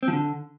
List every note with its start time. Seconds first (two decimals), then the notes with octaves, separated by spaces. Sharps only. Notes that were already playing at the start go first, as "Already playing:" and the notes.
0.03 C4
0.08 F3
0.13 D3